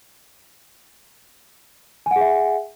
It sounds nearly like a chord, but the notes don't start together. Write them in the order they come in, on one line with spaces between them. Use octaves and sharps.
G#5 F#5 G#4 E5